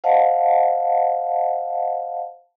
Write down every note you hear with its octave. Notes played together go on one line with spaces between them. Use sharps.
C5 D#5 F5 F#5 A5